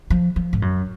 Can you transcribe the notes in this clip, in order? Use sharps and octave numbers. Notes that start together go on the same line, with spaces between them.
F3
F3
G#2
F#2